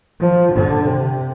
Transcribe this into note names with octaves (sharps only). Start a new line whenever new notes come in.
F3
D3
C3